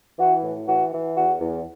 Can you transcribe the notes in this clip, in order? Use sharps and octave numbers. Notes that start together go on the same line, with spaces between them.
E3 F#4
A2
E3 F#4
E3
E2 F#4
E2